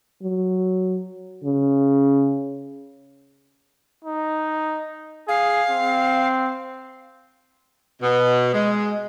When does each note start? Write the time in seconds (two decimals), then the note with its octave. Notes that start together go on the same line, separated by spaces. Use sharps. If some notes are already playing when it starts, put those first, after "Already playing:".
0.22 F#3
1.44 C#3
4.04 D#4
5.28 G#4 F5
5.71 C4
8.02 B2
8.53 G#3